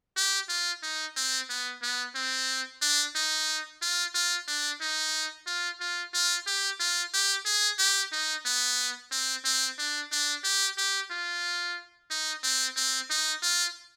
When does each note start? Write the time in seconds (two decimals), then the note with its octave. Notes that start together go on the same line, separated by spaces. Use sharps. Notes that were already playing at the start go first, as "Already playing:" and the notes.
0.16 G4
0.49 F4
0.83 D#4
1.16 C4
1.50 B3
1.82 B3
2.15 C4
2.82 D4
3.15 D#4
3.82 F4
4.14 F4
4.48 D4
4.81 D#4
5.47 F4
5.80 F4
6.14 F4
6.47 G4
6.80 F4
7.13 G4
7.46 G#4
7.79 G4
8.12 D#4
8.45 B3
9.12 C4
9.45 C4
9.78 D4
10.12 D4
10.44 G4
10.78 G4
11.11 F4
12.10 D#4
12.43 C4
12.76 C4
13.10 D#4
13.43 F4